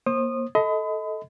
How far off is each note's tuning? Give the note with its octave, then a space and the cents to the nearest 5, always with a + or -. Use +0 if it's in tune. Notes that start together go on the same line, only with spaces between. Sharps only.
A#3 +20 C5 +35 D#6 -20
A4 -5 D#5 +25 B5 +35